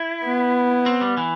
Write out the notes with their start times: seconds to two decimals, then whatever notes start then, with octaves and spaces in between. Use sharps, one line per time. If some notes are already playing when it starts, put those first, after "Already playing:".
Already playing: E4
0.25 B3
0.86 C4
1.01 G3
1.17 E3